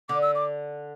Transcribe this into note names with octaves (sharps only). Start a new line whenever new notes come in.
D3 D6
E6
D6